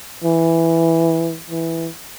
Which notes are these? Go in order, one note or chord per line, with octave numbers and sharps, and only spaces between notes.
E3
E3